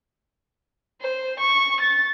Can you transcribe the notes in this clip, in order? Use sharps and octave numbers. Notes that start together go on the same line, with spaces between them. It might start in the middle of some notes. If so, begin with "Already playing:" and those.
C5
C#6
A6